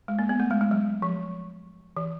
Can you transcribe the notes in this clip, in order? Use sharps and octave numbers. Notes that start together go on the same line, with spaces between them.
G#3
A#3
B3
A3
G#3
G#3
F#3
F3
E3